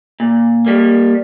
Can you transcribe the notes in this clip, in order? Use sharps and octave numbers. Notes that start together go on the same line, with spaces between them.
A#2
G3 A#3